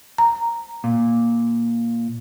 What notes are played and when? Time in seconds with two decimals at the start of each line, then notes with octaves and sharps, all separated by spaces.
0.18 A#5
0.84 A#2